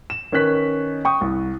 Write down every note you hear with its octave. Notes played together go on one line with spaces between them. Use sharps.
E7
D#3 C#4 B4 F#6 B6
G5 C#6 D#6
C2